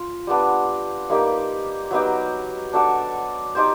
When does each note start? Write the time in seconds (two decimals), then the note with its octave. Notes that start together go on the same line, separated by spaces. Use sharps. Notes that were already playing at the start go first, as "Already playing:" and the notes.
Already playing: F4
0.27 G3 B3 D4
1.10 G3 A#3 D#4 G4
1.91 F#3 B3 D#4 G4
2.73 D4 F#4 A4 D5
3.55 D#4 G4 C5